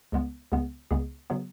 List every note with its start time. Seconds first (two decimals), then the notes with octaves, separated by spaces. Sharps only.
0.12 C#2 C#3 G#3 B3
0.52 C#2 C#3 G#3 B3
0.91 C#2 C#3 G#3 B3 G#4
1.30 C#3 F#3 B3